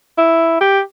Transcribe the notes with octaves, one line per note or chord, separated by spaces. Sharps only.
E4
G4